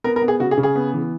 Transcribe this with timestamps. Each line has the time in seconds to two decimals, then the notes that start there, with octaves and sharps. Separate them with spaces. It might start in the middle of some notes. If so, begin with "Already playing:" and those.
0.04 B3 A#4
0.16 A#4
0.22 B3
0.28 G#4
0.40 C#3 F#4
0.51 G#4
0.58 C#3
0.63 G#4
0.75 B3
0.93 E3